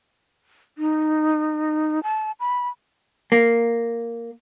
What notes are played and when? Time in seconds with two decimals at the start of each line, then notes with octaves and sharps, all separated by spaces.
0.78 D#4
2.03 A5
2.40 B5
3.32 A#3